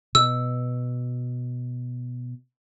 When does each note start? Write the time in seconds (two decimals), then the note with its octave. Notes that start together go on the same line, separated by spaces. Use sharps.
0.15 B2 E6